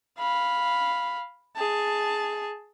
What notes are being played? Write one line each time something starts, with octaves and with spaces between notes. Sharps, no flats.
F5 B5
G#4 A5